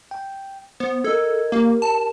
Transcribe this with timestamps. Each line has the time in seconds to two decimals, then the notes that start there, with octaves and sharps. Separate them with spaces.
0.11 G5
0.80 B3 C5
1.04 A4 A#4 D#5 G#6
1.52 A#3 G4 A#4
1.82 A5